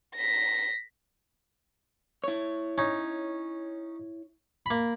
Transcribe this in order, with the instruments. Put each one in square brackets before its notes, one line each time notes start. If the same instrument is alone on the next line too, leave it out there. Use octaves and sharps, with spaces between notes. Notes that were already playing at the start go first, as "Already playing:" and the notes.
[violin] A#6 B6
[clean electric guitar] E4 C#5
[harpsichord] C#4 D#4
A#3 B5